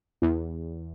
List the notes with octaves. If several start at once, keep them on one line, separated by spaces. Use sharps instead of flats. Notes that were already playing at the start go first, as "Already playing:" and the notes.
E2